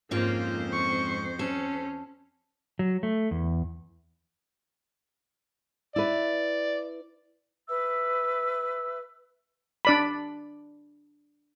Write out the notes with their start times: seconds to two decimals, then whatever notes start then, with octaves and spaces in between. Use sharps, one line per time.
0.11 F2 G#2 A#3 C4 C#4 F4 C5
0.73 C#6
1.39 C#4 A4
2.79 F#3
3.03 A3
3.31 E2
5.96 E4 B4 D5
7.67 B4 E5 E6
9.85 D4 D5 B5